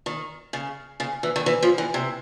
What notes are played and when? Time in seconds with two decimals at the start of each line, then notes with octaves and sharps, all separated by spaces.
0.06 D#3
0.53 C#3
1.00 C#3
1.23 E3
1.36 D#3
1.46 E3
1.63 F3
1.78 E3
1.94 C3